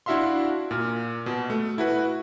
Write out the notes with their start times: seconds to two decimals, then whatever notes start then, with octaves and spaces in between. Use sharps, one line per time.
0.06 D4 E4 F#4 E5 F5 C6
0.71 A#2 F6
1.26 B2
1.50 A3
1.78 E4 F#4 B4